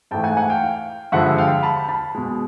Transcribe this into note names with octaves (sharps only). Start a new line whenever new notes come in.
G#2 E3 A3 G5 A5
F#5 G#5
F#5 G#5
F5 G5
G2 D3 F3 G#3 E5 F#5
F5 G5
A5 B5
A5 B5
B2 G#3